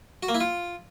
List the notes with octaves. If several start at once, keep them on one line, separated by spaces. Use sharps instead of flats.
F#4
A#3
E4
F4